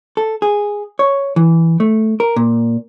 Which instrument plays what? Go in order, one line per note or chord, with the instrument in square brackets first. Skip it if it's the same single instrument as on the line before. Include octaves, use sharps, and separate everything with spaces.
[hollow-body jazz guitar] A4
G#4
C#5
E3
A3
A#4
A#2